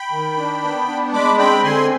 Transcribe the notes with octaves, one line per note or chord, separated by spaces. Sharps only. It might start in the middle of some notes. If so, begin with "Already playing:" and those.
Already playing: G5 B5
D#3
D4
B3
D4
G#3 B5 D6
C4 G5 B5
D3 G#5 C6